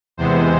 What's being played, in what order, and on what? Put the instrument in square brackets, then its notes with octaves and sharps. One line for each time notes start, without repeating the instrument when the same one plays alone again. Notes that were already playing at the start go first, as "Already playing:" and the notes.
[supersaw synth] E2 C3 E3 G#3 B3 C5